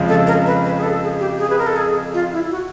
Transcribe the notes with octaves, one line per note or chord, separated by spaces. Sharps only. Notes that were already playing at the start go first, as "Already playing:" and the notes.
Already playing: F2 C#3 F3 G#3
A4
A#4
B4
B4
G#4
A4
G#4
G4
G#4
B4
A#4
A4
G#4
F4
E4
F#4